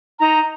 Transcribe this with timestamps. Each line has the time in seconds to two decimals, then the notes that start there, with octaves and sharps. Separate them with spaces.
0.18 D#4 A#5